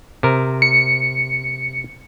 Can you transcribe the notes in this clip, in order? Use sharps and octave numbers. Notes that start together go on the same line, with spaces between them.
C3 A#4
C#7